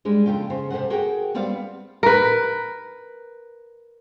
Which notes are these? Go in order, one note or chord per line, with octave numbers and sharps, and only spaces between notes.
G3 G#3 D4
F2 C#3 F4 G5
C#3 C5
C3 A4 C5 D#5 F#5
F#4 G#4 A#4 G5
G3 B3 C4 D4 F5
A#4 B4